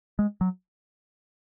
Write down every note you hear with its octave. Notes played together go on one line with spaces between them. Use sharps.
G#3
F#3